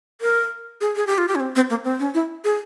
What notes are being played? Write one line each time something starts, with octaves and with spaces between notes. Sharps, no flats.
A#4
G#4
G#4
G4
F4
G4
C#4
C4
C4
A#3
C4
C#4
E4
G#4